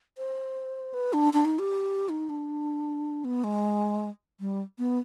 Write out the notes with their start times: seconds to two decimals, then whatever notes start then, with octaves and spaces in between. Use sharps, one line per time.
0.18 C5
0.94 B4
1.13 D4
1.33 D4
1.45 D#4
1.59 G4
2.09 D#4
2.29 D4
3.25 B3
3.44 G#3
4.40 G3
4.79 B3